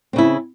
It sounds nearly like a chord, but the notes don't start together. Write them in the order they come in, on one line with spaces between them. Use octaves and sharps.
C4 C#3 E4